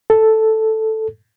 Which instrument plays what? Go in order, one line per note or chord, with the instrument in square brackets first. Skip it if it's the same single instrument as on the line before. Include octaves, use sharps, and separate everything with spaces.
[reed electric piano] A4